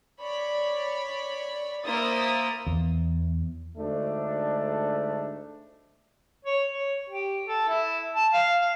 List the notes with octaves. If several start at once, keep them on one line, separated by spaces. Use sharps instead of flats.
C#5 D5 B5
A#3 E4 C5 D#6 A6
E2
D2 G#2 A3 D4
C#5
C#5
G4
A4
E4
A5
F5
F5